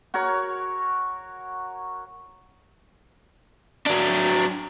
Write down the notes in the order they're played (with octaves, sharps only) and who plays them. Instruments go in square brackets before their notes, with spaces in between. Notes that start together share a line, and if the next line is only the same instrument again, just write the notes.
[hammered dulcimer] F#4 A#4 C#5
[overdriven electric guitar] F#3 D4